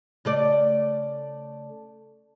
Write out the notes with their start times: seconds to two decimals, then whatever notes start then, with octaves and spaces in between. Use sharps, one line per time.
0.25 C#3 A3 D5